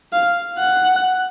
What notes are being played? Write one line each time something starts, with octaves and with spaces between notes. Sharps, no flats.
F5
F#5